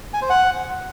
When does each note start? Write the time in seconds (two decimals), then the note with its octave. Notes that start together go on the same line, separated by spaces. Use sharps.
0.14 G#5
0.22 C5
0.30 F#5